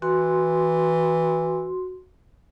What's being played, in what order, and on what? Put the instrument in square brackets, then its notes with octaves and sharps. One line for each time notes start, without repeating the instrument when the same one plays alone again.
[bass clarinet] E3 [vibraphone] F#4 C6